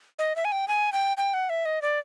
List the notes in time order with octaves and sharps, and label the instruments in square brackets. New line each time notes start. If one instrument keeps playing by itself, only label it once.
[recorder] D#5
E5
G#5
G5
G#5
G5
G5
F#5
E5
D#5
D5